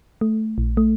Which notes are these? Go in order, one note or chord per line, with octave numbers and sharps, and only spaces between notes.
A3
A#1
A3